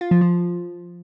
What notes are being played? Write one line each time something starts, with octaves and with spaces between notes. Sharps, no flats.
F4
F3
F3